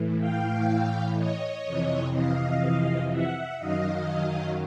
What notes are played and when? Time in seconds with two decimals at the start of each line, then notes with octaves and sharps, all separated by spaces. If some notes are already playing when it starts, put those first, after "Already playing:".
Already playing: A2 E3
0.19 F5 G5
1.16 C#5 D#5
1.65 F2 C3 E3
2.14 D#5 F5
3.10 E5 F#5
3.59 F#2 D#3 F#3 D#5 F5